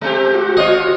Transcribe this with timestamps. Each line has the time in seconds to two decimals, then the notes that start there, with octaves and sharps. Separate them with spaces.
0.01 G#3 C4 G4
0.35 F#4
0.57 F4 C#5 D#5